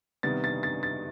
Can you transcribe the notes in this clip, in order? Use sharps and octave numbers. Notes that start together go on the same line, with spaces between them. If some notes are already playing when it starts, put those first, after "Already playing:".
C3 D#3 G3 B3 A6
A6
A6
A6